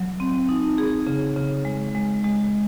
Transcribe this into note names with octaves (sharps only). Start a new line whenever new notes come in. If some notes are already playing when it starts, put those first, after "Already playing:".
Already playing: F#3
C4
D#4
G#4
C#3
C#3
G#3
G#3
G#3